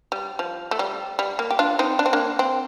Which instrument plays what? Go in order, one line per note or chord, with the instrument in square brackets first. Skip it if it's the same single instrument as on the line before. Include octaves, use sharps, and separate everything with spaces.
[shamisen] G3
F3
A3
G3
G3
A#3
G4
D4 F4
C4 D#4
D4
C4
A#3 D4
C4